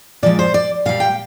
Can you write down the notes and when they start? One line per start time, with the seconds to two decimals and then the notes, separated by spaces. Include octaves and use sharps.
0.23 A#2 F3 G#3 D5
0.39 C5
0.54 D5
0.86 A#2 G3 F5
1.00 G5